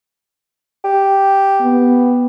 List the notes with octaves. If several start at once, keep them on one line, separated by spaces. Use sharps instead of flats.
G4
B3